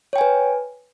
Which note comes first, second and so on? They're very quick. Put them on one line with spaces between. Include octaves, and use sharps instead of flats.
C#5 G5 G#5 B4